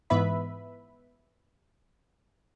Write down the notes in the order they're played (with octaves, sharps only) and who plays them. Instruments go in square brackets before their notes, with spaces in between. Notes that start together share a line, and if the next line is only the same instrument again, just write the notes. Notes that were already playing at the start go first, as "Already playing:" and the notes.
[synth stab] G#2 E3 B3 B4 E5 B5